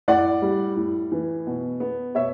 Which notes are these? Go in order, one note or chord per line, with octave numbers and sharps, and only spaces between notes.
A2 D5 F#5
G3
A2
E3
B2
B3
B2 C#5 E5